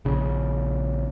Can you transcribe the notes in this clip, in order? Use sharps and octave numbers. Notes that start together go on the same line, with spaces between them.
A#1 C#3